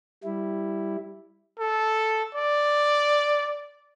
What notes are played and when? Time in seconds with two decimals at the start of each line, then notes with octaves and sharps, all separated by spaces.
0.24 G3 E4
1.60 A4
2.35 D5